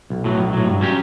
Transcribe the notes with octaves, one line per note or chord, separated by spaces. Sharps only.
B1
A2 F#3
B1
A2 F#3
G2
F#3 C#4 G4